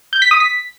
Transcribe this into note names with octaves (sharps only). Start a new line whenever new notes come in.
G6
B6
D#6
B6